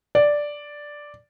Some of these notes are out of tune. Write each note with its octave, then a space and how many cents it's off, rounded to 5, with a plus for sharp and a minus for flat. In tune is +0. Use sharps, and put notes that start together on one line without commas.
D5 +0